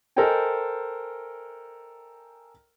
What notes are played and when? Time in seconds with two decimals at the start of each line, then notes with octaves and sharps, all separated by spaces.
0.16 A4 A#4 C5 D#5 G5 G#5